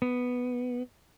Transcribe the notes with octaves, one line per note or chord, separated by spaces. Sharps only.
B3